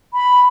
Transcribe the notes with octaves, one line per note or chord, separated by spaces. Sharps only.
B5